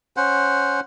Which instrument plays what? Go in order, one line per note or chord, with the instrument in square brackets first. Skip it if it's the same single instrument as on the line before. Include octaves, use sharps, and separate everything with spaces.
[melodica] C#4 C5 F#5